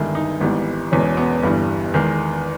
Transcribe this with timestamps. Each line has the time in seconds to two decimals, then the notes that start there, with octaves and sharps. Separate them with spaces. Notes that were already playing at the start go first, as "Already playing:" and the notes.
Already playing: G1 G2 D#3 G#3 E4
0.15 D#4
0.40 G#1 G#2 E3 G3 B3
0.92 E1 E2 B2 G#3 C#4
1.17 B3
1.43 G1 G2 E3 G3
1.94 E2 D#3 G#3